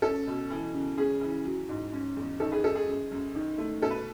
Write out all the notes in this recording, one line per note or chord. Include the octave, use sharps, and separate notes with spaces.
C#4 A4
B2
E3
C#3
C#4 G#4
E3
F#3
G#2
C#4
E2
D#3 A4
G#4 B4
D#3 A4
G#4
F#2
F#2
D#3
A3
B2 A4
B4